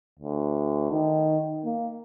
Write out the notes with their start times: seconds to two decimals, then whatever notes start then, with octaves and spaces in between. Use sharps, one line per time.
0.20 D2
0.91 D#3
1.65 A#3